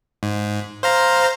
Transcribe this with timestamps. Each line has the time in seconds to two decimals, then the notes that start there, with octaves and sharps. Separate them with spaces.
0.23 G#2
0.83 C5 F5 A#5